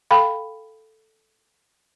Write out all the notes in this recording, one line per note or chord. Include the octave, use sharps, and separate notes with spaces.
A4 F5 G5 B5